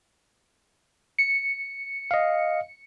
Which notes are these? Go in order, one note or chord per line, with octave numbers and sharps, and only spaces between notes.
C#7
D#5 F5